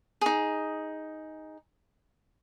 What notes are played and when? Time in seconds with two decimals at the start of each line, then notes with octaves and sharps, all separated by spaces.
0.21 D#4 G#4